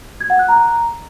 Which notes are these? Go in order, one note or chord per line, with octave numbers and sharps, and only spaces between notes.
G#6
F#5
F#6
A#5